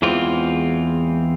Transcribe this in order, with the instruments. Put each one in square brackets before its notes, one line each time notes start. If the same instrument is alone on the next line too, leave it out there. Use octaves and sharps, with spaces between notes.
[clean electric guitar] E2 E3 G#3 C4 F4